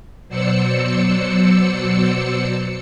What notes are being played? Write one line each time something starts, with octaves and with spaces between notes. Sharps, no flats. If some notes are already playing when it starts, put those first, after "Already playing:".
B2 F#3 C5 D5 E6 C#7